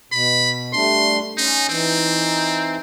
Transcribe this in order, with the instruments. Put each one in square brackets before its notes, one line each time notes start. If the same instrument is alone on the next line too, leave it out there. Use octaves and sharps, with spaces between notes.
[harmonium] B2 [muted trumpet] B5
[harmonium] G3 A3 D4 [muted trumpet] C6
[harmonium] C#4 [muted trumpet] D#4
[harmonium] E3 D#4 [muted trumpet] C4